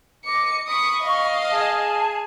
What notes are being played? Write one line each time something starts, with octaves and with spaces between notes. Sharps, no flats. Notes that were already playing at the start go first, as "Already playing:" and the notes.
D#5 D6 C#7
B5 C#6 D#6 C#7
D#5 F5
G#4 A5